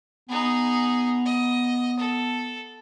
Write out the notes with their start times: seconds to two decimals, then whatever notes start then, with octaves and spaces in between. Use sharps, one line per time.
0.29 B3 D#4 G#4
1.25 D#5
1.99 A4